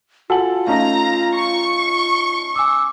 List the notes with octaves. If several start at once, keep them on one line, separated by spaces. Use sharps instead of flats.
F4 F#4 A4 F#5 G#5 F#7
A3 C#4 D#4 F5 A#5
C#6
G#5 D6 E6